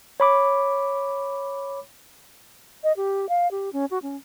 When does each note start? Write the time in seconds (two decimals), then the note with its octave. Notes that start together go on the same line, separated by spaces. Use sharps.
0.20 C#5 B5 D6
2.84 D#5
2.97 G4
3.29 F5
3.51 G4
3.73 C#4
3.91 F#4
4.02 C#4